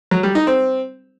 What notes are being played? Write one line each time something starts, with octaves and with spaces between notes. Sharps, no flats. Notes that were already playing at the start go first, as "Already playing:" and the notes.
F#3
G3
D#4
C4